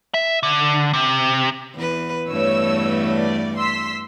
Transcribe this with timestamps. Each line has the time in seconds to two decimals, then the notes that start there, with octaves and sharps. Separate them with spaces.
0.14 E5
0.43 D3
0.93 C3
1.75 E2 B4
2.28 E2 G2 A3 C#5 E6
3.17 D5
3.56 C6 E6 B6